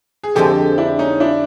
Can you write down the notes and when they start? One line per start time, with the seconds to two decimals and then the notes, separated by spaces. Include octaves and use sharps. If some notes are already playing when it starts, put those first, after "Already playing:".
0.23 G#4
0.35 F2 D3 F3 G#3 C4 G4 A4
0.78 D4 E4
0.99 C#4 D#4
1.20 D4 E4